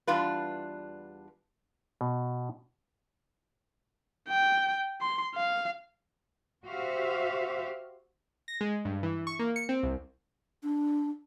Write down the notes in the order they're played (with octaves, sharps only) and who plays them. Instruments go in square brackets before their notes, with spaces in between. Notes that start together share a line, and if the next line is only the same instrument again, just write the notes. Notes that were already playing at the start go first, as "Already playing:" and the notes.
[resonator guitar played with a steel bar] E2 G3 D4 F4 B4
[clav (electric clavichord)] B2
[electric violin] G5
C6
F5
[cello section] F#4 G4 C5 E5 F5
[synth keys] A#6
G#3
G2
E3
C#6
A#3
C#7
C4
C2
[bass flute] D4